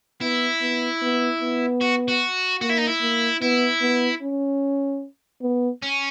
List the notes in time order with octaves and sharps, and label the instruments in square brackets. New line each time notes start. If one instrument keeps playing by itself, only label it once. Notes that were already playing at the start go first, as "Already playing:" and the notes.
[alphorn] B3 [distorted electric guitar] E4
[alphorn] B3
B3
B3
[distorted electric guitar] F#4
F#4
[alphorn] A#3 [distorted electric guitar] F#4
[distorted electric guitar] E4
D#4
E4
[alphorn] A#3
[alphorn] B3 [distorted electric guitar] E4
[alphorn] B3
C#4
B3
[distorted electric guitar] C#4